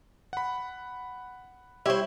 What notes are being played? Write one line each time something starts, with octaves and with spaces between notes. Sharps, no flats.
F#5 B5
G3 E4 G4 C5 C#5 E5